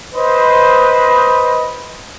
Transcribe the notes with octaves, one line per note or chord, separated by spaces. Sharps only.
B4 C5 D#5